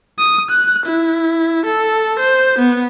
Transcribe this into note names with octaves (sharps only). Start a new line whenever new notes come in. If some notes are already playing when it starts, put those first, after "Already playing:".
D#6
F#6
E4
A4
C5
B3